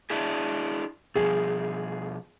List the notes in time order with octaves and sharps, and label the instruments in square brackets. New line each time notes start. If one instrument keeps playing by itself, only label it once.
[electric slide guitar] D4 E4 G#4
[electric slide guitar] B2 F3 [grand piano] G#4